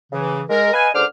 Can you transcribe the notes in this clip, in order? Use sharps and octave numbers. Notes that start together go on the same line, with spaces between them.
C#3 E3
G#3 A#4
B4 D#5 F5 G#5
C#2 D3 C5 D6 F6